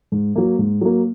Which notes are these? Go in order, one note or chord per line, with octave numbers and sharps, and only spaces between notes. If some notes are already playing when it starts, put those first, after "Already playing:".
G#2
F#3 A#3
G#2
F#3 A#3